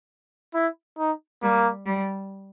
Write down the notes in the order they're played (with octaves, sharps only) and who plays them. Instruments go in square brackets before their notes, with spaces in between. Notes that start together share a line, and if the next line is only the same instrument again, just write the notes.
[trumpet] E4
D#4
[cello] G3 [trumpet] A#3
[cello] G3